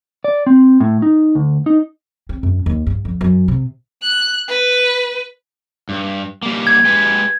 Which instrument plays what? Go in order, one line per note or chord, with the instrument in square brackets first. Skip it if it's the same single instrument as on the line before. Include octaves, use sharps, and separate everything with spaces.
[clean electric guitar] D5
C4
A2
D#4
D2
D#4
[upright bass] C4
F#2
D#2
G2
F2
F#2
C3
[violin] F#6
B4
[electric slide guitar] G2
G3 A#3
[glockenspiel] G#6
[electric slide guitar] G#3 G4 B4